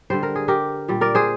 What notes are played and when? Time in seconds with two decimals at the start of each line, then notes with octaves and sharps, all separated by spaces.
0.10 D3 G3 C5
0.23 A#4
0.35 G#4
0.48 G4 A#4
0.88 A#2 G3
1.01 A#4 D5
1.15 G#4 C5